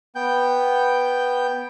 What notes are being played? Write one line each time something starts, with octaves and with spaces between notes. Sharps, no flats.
B3 G5 G6